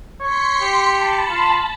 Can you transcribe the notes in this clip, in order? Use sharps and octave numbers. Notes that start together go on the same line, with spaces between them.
C#5 C6 B6 C#7
G4
A5 B5
F4